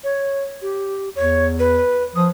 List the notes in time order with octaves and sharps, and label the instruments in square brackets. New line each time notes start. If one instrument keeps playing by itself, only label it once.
[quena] C#5
G4
[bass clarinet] E2 [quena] C#5
[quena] B4
[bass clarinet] F3 [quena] D#6